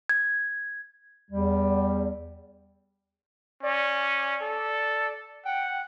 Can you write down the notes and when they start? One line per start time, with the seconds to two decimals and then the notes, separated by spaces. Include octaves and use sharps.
0.09 G#6
1.31 E2 G3
3.63 C#4 D5
4.41 A4
5.45 F#5 G5